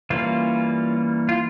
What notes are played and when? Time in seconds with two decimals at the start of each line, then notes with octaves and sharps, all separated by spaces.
0.10 E3 G3 A#3 C#4 F4
1.29 F4